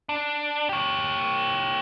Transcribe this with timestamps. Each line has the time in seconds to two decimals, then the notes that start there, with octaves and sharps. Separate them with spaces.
0.09 D4
0.69 G4 C#5